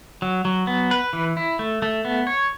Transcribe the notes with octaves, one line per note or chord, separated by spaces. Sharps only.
F#3
F#3
B3
B4
E3
E4
A3
A3
B3
C#5